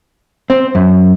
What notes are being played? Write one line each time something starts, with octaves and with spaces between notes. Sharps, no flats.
C4
F#2